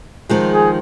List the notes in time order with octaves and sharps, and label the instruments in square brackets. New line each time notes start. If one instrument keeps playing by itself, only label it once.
[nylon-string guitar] D#3 F3 G#3
[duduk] G#4